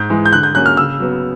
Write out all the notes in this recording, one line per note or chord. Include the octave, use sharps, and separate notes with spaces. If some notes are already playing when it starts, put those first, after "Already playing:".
Already playing: G#2 G6
E3 G#3
G6
D3 F#6
G6
F#3 A#3 C#4 F#6
F6
C#3 E6
F#3 B3